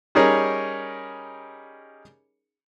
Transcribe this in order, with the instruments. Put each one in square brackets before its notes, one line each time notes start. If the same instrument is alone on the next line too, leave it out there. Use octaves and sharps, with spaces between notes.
[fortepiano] G3 C#4 D#4 G#4 A#4 C#5